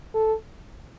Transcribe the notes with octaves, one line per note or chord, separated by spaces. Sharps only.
A4